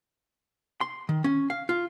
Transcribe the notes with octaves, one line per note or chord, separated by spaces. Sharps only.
C6
D#3
C#4
F5
F4